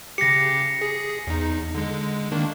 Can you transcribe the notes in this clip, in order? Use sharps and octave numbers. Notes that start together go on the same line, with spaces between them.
C#3 G4 A#6 C7 C#7
G#4
E2 D#4
D3 G#3
D#3 A#3 D4